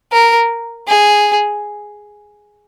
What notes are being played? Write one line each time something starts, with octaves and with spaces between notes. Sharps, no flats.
A#4
G#4